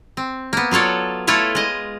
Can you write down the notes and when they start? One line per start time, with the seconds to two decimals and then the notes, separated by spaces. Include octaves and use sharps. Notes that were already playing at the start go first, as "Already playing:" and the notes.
0.17 C4
0.53 A#3 B3
0.71 F#3 F4 A4 C#5 D5
1.27 A3 E4 F4 A4 C#5
1.55 G#3 D#5